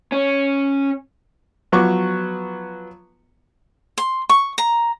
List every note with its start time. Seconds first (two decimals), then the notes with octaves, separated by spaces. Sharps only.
0.12 C#4
1.72 F3 F#3 B3 F#4 C#6 D6
3.98 C6
4.29 C#6
4.58 A#5